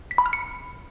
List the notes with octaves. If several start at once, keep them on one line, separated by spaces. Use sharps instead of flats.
B6
B5
F6
C#7